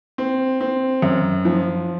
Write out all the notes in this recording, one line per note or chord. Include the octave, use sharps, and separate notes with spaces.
C4
C4
F#2
F3